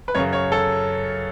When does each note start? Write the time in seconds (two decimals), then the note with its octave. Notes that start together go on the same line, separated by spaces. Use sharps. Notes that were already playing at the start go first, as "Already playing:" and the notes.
0.08 B4
0.15 F#2 C#3 C#5
0.33 C#5
0.52 A4